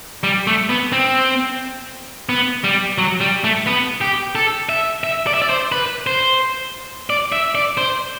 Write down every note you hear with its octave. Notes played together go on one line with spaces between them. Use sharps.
G3
A3
B3
C4
B3
G3
F#3
G3
A3
B3
G4
A4
E5
E5
D5
E5
D5
C5
B4
C5
D5
E5
D5
C5